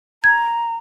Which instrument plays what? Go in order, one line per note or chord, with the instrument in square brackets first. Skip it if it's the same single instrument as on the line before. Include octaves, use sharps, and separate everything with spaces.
[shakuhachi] A#5 [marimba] G#6